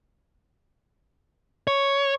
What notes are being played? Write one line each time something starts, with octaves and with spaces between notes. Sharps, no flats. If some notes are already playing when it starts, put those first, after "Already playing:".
C#5